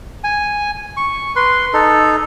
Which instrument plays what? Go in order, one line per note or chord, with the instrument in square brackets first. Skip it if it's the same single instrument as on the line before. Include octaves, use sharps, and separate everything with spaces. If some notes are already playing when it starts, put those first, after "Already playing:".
[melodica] G#5
C#6
B4 C6
D#4 A4